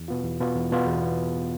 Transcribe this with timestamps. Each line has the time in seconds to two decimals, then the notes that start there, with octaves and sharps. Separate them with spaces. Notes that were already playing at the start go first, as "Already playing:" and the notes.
Already playing: E2
0.08 B2 B3 F4
0.24 E2
0.40 B2 B3 F4
0.56 E2
0.72 B2 B3 F4
0.87 E2